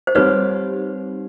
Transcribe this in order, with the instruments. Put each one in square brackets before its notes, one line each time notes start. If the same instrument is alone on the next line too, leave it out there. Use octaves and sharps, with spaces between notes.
[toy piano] C5
[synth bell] G3 C4 D#4 G4 [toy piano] B4 C#5